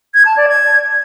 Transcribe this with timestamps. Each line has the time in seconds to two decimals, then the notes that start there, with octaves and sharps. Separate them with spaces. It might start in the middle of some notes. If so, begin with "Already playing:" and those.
0.14 G#6
0.26 A5
0.37 D5
0.48 G#6